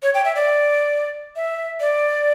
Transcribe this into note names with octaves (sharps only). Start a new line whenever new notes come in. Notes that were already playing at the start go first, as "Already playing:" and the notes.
C#5
G5
E5
D5
E5
D5